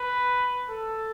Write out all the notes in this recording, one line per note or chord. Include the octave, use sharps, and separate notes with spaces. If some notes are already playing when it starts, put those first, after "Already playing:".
Already playing: B4
A4